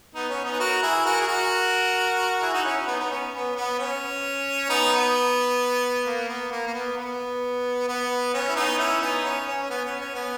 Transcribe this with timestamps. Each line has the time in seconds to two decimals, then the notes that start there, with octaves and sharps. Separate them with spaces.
0.15 B3 D#4
0.29 C#4
0.44 B3 D#4
0.53 B4
0.60 F#4 A#4
0.82 E4 G#4
1.05 F#4 A#4
1.20 G#4
1.28 F#4 A#4
2.41 E4 G#4
2.53 D#4 F#4
2.64 C#4 E4
2.87 B3 D#4
2.99 B3
3.10 C#4
3.33 B3
3.56 B3
3.79 C#4
4.69 B3 D#4
4.92 B3
6.06 A#3
6.29 B3
6.51 A#3
6.67 A#3
6.74 B3
6.97 B3
7.88 B3
8.34 C#4
8.49 E4
8.56 B3 D#4
8.78 C#4 E4
9.01 B3 D#4
9.24 C#4
9.47 C#4
9.62 C#4
9.70 B3
9.85 C#4
10.00 C#4
10.15 B3